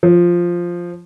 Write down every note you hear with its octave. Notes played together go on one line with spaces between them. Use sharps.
F3